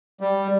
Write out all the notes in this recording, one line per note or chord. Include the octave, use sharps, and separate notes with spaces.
G3